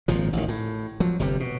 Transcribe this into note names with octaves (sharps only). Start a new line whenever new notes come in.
G#1 A#2 F3
A1 D#3
A2
F3 F#3
G1 C3 G3
B2